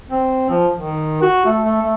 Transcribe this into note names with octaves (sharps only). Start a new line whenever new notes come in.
C4
F3
D#3
F#4
A3
A3
A3